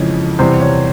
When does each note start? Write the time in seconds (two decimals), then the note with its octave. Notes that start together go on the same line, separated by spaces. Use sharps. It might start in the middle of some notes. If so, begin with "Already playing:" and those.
Already playing: F2 C#3 E3 G#3 C#5
0.39 E2 C3 G3 C5
0.61 C#5